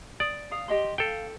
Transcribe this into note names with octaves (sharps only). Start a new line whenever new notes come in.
D5 D#6
F5 D#6
G4 D#5 C6
A4 F5 G5